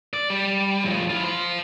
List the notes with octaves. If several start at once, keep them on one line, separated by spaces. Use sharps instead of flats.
D5
G3
A2 F3
E4 F4
C5 F5